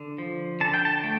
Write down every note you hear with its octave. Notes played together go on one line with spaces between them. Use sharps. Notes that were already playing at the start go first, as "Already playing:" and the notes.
Already playing: D3
F3
D3 A5
G5
A5
A3 G5